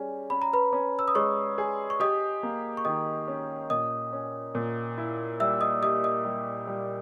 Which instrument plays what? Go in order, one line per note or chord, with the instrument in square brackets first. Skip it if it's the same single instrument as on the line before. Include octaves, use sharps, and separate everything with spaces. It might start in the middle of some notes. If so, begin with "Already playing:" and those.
Already playing: [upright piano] G3 C#4 [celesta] G#4 G#5
[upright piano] C#4 [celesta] B5
[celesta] A#5
B4 B5
[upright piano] C#4
[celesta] E6
D#6
[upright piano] G#3 [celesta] C#5 C#6
[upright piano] G#4
[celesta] C#6
[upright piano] G4 [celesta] D#5 D#6
[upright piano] A#3
[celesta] C#6
[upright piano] D#3 [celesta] D#5 D#6
[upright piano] C#4
[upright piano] A#2 [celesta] D#5 D#6
[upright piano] C#4
A#2
E4
[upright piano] G3 [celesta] E5 E6
[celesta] D#5 D#6
[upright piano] G4 [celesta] D#5 D#6
[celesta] D#5 D#6
[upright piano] G3
G3